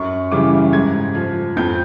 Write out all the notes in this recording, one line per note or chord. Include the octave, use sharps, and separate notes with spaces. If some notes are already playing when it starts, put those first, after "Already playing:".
Already playing: F#2 C#6
C#3 E3 G3 D6
G#2 G#6
F3
F2 G6